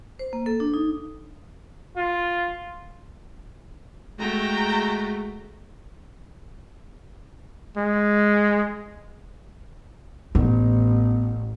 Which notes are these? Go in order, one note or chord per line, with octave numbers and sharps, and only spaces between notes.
C5
A#3
A4
D4
D#4
F4
G#3 A3 F#4 G5 A#5
G#3
A1 B3